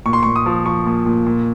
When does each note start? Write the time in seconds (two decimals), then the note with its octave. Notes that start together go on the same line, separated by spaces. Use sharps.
0.06 A#2 C#6
0.13 C6
0.23 A#2 C#6
0.36 D#6
0.46 F3
0.65 F3 C#6
0.86 A#2
1.06 A#2
1.26 A#2